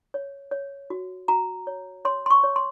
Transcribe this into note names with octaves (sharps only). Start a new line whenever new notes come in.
C#5
C#5
F#4
F#4 A#5
C#5
C#5 C6
C6
C#6
C#5
C6